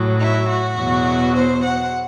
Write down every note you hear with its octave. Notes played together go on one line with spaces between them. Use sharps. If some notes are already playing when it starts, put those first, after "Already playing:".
Already playing: A2 F#3
E4
F#4
E2 B2 F#3
C5
F#5